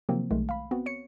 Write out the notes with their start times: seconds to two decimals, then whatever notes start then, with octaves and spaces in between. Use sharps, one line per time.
0.09 C3 D#3 F3 F#3 A#3 C4
0.31 B1 D#3 G#3 A3
0.49 F5 B5
0.71 B3 C4 F#4
0.86 C#5 C#7